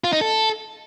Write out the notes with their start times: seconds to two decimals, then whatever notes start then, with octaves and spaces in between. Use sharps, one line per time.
0.04 F4
0.13 D#4
0.21 A4